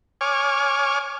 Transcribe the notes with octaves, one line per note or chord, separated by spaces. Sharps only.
C#5 G#5 D6 F6